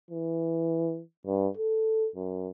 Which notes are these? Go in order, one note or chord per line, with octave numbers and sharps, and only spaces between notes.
E3
G2
A4
F#2